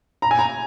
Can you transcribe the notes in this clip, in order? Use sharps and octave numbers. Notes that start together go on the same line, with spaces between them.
A#5
G#5
A#5